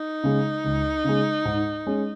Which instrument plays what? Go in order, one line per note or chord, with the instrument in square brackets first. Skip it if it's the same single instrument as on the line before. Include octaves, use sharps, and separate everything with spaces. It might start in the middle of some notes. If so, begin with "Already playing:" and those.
Already playing: [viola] D#4
[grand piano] C#3 G#3
C#2
C#3 G#3
G#2
G#3 C#4